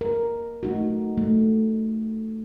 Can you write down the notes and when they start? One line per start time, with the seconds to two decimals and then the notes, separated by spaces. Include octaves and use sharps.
0.01 A#4
0.63 A3 D#4 F#4
1.18 A3